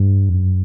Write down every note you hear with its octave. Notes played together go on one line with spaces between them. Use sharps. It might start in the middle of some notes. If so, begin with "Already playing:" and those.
Already playing: G2
F2
F#2